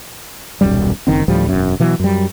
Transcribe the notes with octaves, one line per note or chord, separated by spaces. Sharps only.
D#1 B1 F#2 G3
F#1 D#3 C4
D2 A2 F3 G3
E1 F#2
B2 E3 F#3
F#2 G3